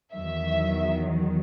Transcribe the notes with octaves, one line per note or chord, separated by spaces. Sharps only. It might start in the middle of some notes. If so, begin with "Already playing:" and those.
E2 D#3 F#3 E5